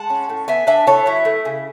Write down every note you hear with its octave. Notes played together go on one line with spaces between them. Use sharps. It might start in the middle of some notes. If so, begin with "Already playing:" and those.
Already playing: G#3 F#5 A5
C#4
A2
B3 E5 G#5
D4 E5 G#5
E3 A4 C#5
F#3 E4
A3
C#3